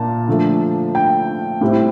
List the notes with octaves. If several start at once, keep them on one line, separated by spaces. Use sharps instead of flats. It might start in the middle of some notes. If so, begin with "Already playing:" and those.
Already playing: A#2 A#3 A5
D3 F3 A3
G5
A2 G3 C4 E4